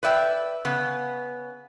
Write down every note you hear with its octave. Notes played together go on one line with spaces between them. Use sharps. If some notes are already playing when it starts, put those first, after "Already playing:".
B4 D5 E5 G5
C#3 B3